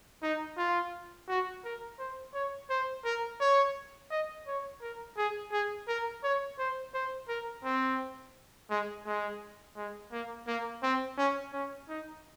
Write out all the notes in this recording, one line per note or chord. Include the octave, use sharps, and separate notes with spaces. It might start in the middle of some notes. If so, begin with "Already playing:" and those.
D#4
F4
F#4
A#4
C5
C#5
C5
A#4
C#5
D#5
C#5
A#4
G#4
G#4
A#4
C#5
C5
C5
A#4
C4
G#3
G#3
G#3
A#3
A#3
C4
C#4
C#4
D#4